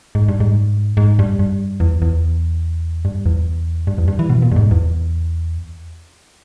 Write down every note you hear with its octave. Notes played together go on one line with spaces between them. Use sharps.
G#2
G2
G#2
G#2
G2
G2
E2
E2
G2
E2
G2
E2
G2
E3
B2
A#2
G2
G#2
E2